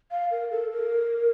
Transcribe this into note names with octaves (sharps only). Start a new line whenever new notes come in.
F5
A#4
A4
A#4